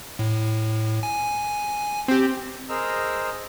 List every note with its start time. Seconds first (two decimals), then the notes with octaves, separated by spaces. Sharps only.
0.19 A2
1.03 G#5
2.08 C4 G4
2.68 G#4 A#4 C5 D#5 A#5 E6